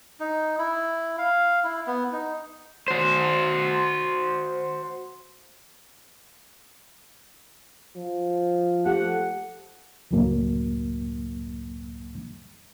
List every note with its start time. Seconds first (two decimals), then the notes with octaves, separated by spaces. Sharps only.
0.20 D#4
0.59 E4
1.18 F5
1.64 E4
1.87 B3
2.13 D#4
2.88 F#4 C5
7.96 F3
8.85 A3 G4 A4 F#5
10.11 C#2 F#2 A2 F#3 A#3